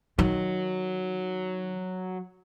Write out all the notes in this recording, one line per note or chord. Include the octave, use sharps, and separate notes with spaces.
D#3 F#3